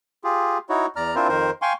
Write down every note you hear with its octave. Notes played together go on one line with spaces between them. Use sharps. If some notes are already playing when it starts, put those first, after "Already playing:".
F4 G4 G#4
D#4 E4 F#4 C#5
E2 D5 A#5 F6
C4 D4 E4 F4 A#4 C5
F2 D#3 A#4 C5
F5 G5 G#5 C6 C#6